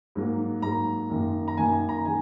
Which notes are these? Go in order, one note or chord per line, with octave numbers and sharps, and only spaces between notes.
G#2 F#3 A#3
G#2 F#3 A#3 A#5
F#2 D#3 A#3
A#5
F#2 D#3 A#3 G#5
G#5
A#5
D#3 G#3 G#5